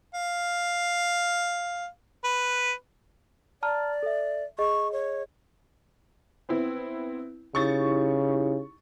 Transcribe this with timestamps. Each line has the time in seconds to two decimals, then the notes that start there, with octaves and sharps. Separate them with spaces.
0.14 F5
2.24 B4
3.63 D5 A5 A#5 F6
4.03 A4 E5
4.59 G#4 D#5 C#6
4.92 C#5
6.49 B3 C4 E4
7.55 C#3 D#4 E4 G4 C#6 A6